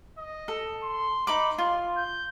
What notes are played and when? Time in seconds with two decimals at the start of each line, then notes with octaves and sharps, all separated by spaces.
0.18 D#5
0.48 A4
0.83 C6
1.27 D#4 B5 C6 D6
1.58 F4
1.97 G6